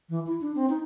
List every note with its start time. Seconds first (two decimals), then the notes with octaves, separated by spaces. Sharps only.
0.09 E3
0.27 E4
0.41 D4
0.56 C4
0.70 D#4